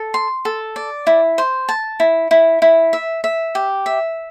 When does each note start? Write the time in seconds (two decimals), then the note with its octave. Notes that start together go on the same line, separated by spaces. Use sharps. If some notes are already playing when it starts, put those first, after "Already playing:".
Already playing: A4
0.14 C6
0.45 A4
0.76 D5
1.07 E4
1.38 C5
1.69 A5
2.00 E4
2.31 E4
2.62 E4
2.93 E5
3.24 E5
3.55 G4
3.86 E5